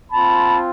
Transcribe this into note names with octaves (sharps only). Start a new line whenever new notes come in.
C4 F4 A5 B5